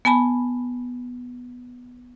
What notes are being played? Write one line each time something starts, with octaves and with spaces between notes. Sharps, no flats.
B3 G#5 A5 B5